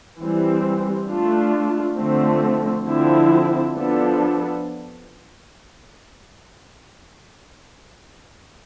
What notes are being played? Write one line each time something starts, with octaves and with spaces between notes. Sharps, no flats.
E3 G3 C4
A3 D4 F4
D3 F3 A3 C4
D3 F3 C4 E4
F3 B3 D4 A4